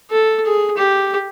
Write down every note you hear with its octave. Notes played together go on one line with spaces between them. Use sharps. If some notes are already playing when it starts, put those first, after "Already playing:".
A4
G#4
G4